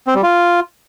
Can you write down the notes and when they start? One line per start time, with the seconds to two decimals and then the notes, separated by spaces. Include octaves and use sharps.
0.07 C4
0.15 G3
0.23 F4